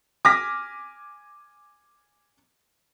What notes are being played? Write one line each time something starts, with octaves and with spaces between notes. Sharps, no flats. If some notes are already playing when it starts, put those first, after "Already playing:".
G#5 D6 F6 A#6 B6